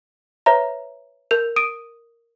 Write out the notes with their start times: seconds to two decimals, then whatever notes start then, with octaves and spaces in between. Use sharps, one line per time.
0.46 B4 C#5 E5 A#5
1.31 A#4 G6 F7
1.56 D#6 D7 D#7